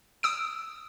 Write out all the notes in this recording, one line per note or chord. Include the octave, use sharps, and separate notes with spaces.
D#6 E6 D7